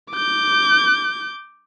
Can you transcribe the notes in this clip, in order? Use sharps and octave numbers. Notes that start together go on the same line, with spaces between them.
D6 G6